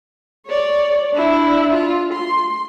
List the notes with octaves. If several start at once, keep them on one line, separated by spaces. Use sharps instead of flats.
C#5 D5
D4 E4
F4
C6